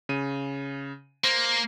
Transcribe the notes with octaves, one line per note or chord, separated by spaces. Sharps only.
C#3 D#7
A#3 C5